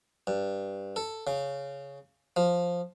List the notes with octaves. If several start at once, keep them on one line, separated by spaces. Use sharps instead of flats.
G2
A4
C#3
F3